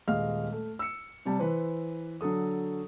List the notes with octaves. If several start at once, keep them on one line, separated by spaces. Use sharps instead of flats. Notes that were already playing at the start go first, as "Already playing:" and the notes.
D#1 G#3 D#5 F5 F6
A3
E6 C#7
C3 G3 A5
E3 B4 C5
D3 F#3 A4 D#6